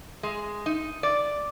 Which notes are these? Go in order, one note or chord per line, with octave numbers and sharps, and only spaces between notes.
G#3
D#4
D5